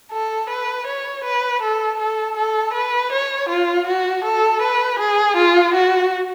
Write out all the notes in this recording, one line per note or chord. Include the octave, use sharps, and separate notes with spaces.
A4
B4
C#5
B4
A4
A4
A4
B4
C#5
F4
F#4
A4
B4
G#4
F4
F#4